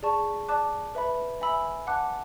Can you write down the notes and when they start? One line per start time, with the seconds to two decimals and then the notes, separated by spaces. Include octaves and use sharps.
0.03 G#4 D5 A5 C#6
0.48 D5 A5 D6 F#6
0.95 B4 E5 B5
1.41 E5 G#5 B5 E6
1.87 F#5 A5 D6 F#6